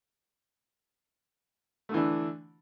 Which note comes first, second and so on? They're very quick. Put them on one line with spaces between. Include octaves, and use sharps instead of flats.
A3 D3 E3 D4